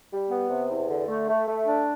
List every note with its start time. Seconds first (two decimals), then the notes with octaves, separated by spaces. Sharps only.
0.11 G3
0.31 B3
0.50 C3
0.70 E2
0.89 D3
1.08 A3
1.28 A3
1.47 A3
1.67 D4